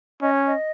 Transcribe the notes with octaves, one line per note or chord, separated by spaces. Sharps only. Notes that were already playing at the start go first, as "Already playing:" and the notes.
C#4 D#5
C#5
D#5